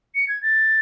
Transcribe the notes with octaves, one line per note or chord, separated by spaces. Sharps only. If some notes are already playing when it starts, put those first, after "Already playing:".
C#7
G#6
A6